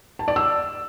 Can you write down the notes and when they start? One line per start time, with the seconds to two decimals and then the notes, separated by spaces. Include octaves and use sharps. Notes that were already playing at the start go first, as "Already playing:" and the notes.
0.19 A5
0.28 D5
0.36 E6